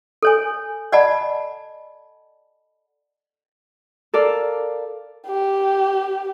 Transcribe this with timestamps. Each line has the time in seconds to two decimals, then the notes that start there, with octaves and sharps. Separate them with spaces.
0.22 A4 C#5 G#5
0.92 D5 D#5 F#5 A5 B5
4.14 A4 A#4 D5 F5
5.27 G4